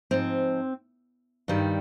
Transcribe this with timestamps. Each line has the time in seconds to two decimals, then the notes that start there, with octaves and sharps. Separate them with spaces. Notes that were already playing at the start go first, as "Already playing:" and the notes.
0.11 G#2 F3 C4
1.48 G2 D#3 G3